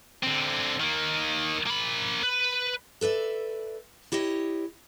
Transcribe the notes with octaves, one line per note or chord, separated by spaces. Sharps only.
D3 C4
D#3 A#3
A#3 B5
B4
A4 B4 D5 E5
E4 G4 C#5 D#5